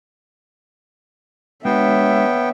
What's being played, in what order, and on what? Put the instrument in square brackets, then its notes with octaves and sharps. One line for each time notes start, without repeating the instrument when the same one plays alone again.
[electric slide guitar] G#3 D4 F#4 [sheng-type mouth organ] B3 G5 [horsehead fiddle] C#5 E5